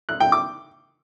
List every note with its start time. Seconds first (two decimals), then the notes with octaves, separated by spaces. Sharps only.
0.09 F#6
0.20 G5
0.32 D6